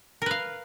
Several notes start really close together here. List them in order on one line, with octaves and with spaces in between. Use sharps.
A#4 B4 F5